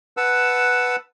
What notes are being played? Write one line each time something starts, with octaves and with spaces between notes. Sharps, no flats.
B4 F#5 A5 E6